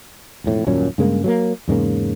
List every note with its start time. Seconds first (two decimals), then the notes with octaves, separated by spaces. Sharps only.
0.44 E1 F2 A2
0.67 D#1 F#2 A#2 C#4
0.98 G2 C#3 G#3 A#3
1.24 F#3 A3 A#3
1.68 E2 G#2 C#3 A#3